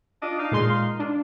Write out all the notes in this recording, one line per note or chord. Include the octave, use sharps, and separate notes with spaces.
D4 F4 D#5
D#4 F5
A#2 G#3 C6
D4